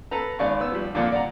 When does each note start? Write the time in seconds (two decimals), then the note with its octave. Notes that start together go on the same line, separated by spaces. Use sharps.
0.11 A4 B4 A#5
0.39 G#1 D5 F5 C#6
0.59 B3 E6
0.72 F3 G3
0.94 F2 A#2 D3 A#3 D4 F4
1.12 D5 F#5 A#5